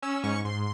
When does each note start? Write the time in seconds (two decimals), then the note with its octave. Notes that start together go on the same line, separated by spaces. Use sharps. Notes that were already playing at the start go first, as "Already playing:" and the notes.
0.02 C#4 E6
0.23 G#2 C#6
0.45 G#2 C6